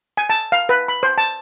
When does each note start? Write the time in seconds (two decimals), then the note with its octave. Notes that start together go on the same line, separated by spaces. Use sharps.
0.17 G#5
0.30 A5
0.52 F5
0.69 B4
0.88 B5
1.03 C5
1.18 A5